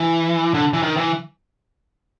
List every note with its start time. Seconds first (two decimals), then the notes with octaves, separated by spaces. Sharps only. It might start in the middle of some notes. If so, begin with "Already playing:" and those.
Already playing: E3
0.54 D3
0.73 E3
0.83 D#3
0.97 E3